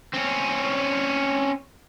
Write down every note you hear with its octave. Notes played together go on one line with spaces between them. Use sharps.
C4 C#4